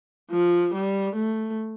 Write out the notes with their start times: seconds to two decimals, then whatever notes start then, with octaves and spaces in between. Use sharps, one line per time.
0.31 F3
0.74 G3
1.15 A3